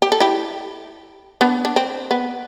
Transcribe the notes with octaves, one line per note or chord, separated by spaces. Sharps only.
G4
A4
E4 G4
B3 D4
D4
C4
B3